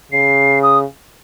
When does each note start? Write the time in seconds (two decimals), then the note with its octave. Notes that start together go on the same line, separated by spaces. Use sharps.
0.12 C#3 C7
0.63 D#6